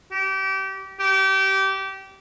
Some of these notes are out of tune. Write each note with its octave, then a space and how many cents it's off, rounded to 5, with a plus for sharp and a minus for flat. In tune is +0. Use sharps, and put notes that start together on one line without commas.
G4 -30
G4 -25